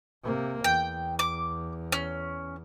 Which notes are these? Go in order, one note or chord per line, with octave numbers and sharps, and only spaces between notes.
C3 A#3
E2 G5
D6
C#4